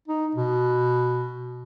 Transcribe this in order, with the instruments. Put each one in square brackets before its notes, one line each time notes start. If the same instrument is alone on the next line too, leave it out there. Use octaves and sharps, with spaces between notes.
[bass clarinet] D#4
B2